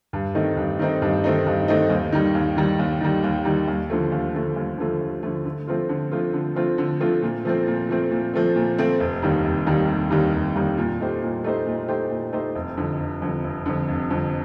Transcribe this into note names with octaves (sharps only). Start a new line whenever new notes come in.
G2
D#3 A3 C4 D#4
G2
D#3 A3 C4 D#4
G2
D#3 A3 C4 D#4
G2
D#3 A3 C4 D#4
D#2
D#3 G3
D#2
D#3 G3
D#2
D#3 G3
D#2
D#3 G3
D#2
D3 F3 A3
D#2
D3 F3 A3
D#2
D3 F3 A3
D#2
D3 F3 A3
D3
F3 A3 C4 F4
D3
F3 A3 C4 F4
D3
F3 A3 C4 F4
D3
F3 A3 C4 F4
A#2
F3 A3 C4
A#2
F3 A3 C4
A#2
F3 A3 C4
A#2
F3 A3 C4
F1
D#2 D#3 G3
F1
D#2 D#3 G3
F1
D#2 D#3 G3
F1
D#2 D#3 G3
A#2
A3 D#4 G4 C5
A#2
A3 D#4 G4 C5
A#2
A3 D#4 G4 C5
A#2
A3 D#4 G4 C5
F1
F2 D3
F1
F2 D3
F1
F2 D3
F1
F2 D3